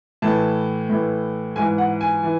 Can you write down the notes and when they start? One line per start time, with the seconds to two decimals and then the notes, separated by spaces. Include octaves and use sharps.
0.22 A2 E3 A5
0.89 A2 E3
1.56 G#2 E3 G#5
1.78 F#5
2.01 G#5
2.23 E3